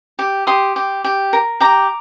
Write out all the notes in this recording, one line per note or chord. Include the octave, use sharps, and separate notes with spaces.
G4
G4 C6 D#6
G4
G4
A#4
G4 A#5 D6